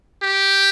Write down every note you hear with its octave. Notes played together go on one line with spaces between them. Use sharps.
G4